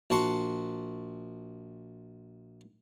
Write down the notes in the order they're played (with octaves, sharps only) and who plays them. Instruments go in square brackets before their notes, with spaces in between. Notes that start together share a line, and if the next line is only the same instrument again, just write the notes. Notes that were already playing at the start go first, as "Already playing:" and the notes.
[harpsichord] A#1 F#4 A5 C6 C#6